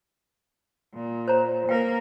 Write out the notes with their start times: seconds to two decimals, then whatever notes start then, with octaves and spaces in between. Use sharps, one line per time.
0.94 A#2
1.28 C5 C#5 A#5
1.69 A#3 A#4 B4 F5 G5